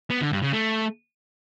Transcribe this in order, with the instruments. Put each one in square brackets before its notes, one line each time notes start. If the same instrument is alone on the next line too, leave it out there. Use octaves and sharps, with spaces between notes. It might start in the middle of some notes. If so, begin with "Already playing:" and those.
[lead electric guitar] B3
D3
G2
C#3
A3